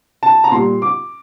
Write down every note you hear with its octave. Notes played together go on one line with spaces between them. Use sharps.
A5
A#5
A#2 G3 C6
D6